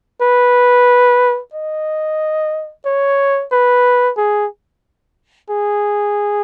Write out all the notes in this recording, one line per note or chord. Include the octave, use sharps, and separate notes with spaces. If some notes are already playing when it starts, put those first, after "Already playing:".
B4
D#5
C#5
B4
G#4
G#4